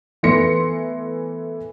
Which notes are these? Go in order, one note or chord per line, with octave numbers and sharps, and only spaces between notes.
E3 A3 B3 C6 A#6 C#7